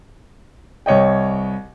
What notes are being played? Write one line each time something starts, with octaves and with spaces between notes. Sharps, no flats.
C2 C#5 D#5 G5